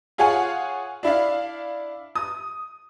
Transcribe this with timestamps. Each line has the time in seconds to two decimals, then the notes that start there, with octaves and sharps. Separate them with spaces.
0.18 F4 G#4 C#5 F5 F#5 G#5
1.03 D4 E4 D5 F5
2.15 D#6